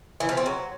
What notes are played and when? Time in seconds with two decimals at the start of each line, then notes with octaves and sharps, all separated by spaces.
0.20 E3
0.29 F3
0.37 C4
0.46 F#3